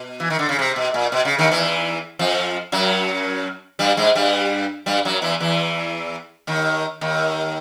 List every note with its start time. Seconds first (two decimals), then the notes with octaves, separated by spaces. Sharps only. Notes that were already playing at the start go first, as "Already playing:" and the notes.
Already playing: B2
0.20 E3
0.30 D#3
0.39 D3
0.49 C#3
0.59 C3
0.76 B2
0.94 A#2
1.12 B2
1.25 C#3
1.38 D#2 D#3
1.51 E2 E3
2.19 F2 F3
2.72 F#2 F#3
3.79 G2 G3
3.97 G#2 G#3
4.15 G2 G3
4.86 G2 G3
5.05 F#2 F#3
5.22 E2 E3
5.40 E2 E3
6.47 D#2 D#3
7.01 D#2 D#3